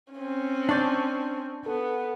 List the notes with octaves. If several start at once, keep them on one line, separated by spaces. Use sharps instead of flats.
C4 C#4
D4 D5 A5 C#6 G6
B3 A4